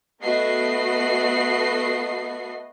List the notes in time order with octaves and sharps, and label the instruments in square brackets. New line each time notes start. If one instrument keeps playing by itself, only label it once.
[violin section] A3 B3 F#4 D#5 C7